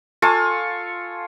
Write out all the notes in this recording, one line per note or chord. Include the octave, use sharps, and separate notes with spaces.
F4 A4 G#5 C#6